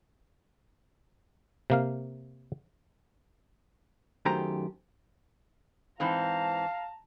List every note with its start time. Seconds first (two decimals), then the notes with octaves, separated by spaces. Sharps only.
1.70 C3 A#3 F5
4.25 F#2 D#3 A3 G4 C5 A#5
6.00 G#2 E3 C4 F5 A5 A#5